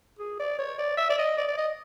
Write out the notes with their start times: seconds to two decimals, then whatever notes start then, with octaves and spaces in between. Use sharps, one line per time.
0.19 G#4
0.39 D5
0.58 C#5
0.78 D5
0.97 E5
1.09 D5
1.18 D#5
1.37 D5
1.47 D5
1.58 D#5